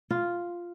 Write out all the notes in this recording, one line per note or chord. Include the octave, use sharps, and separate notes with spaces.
F4